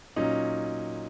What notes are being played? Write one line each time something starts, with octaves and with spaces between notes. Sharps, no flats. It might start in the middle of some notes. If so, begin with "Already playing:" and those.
A#2 F#3 C#4 D#4